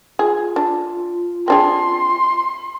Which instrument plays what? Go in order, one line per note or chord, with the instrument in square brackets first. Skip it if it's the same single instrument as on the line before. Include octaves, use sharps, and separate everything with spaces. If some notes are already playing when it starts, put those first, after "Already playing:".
[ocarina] F4 [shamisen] G#4
[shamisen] D4
[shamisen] C4 D4 G#4 [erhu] C6